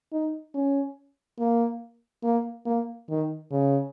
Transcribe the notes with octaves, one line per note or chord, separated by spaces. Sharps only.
D#4
C#4
A#3
A#3
A#3
D#3
C#3